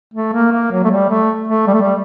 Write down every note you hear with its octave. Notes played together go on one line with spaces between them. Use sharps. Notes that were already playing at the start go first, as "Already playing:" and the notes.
A3
A#3
A#3
F#3
A3
G3
A3
A3
G3
A3
G3